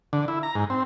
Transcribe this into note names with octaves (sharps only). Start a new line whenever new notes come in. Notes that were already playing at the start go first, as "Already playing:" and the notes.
D3
E4
A#5
G#2
C4